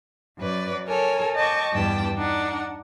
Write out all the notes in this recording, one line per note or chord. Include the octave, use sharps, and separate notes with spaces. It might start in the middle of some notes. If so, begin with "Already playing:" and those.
F#2 B4 D5
A4 A#4 C#5 G#5
D#5 G5 A5 C#6 D6
E2 G2 B3 D5 G5 A5
D4 D#4 F#5